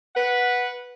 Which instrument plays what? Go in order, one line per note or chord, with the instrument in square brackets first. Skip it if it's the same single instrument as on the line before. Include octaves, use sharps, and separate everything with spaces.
[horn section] B4 F#5